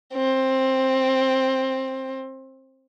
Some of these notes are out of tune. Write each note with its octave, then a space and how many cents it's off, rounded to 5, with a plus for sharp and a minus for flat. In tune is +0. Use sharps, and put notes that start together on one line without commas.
C4 +10